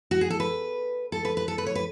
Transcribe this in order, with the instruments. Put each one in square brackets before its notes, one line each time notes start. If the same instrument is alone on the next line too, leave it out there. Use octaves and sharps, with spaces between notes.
[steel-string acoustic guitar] F#4
G#4
A4
B4
A4
B4
B4
A4
B4
C#5
B4